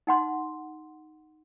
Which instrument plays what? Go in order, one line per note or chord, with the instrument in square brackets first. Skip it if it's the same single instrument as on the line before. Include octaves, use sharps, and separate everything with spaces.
[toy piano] D#4 F#5 C6